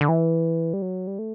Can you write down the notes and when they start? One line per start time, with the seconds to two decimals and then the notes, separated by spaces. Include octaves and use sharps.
0.01 D3
0.09 E3
0.73 G3
0.82 F#3
1.07 G3
1.19 A3